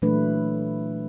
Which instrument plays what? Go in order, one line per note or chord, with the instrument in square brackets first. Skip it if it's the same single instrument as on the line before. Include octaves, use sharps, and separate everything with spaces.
[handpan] A#2 E3 F#3 A3 D4 B4